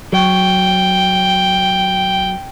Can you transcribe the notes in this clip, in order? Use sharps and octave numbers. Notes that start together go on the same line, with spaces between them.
F#3 G5